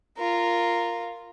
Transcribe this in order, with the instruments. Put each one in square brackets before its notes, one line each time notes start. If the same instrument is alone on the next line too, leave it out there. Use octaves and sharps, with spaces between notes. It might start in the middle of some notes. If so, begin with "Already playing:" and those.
[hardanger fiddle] F4 A#4